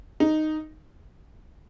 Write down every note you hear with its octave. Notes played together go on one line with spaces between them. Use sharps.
D#4